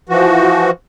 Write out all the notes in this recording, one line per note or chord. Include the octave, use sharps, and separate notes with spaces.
E3 F3 F#4